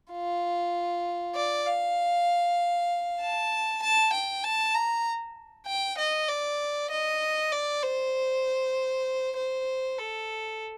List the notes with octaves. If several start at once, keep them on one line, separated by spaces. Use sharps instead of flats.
F4
D5
F5
A5
A5
G5
A5
A#5
G5
D#5
D5
D#5
D5
C5
C5
A4